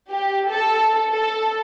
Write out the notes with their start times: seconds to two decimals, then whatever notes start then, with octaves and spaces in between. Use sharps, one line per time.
0.11 G4
0.49 A4
1.11 A4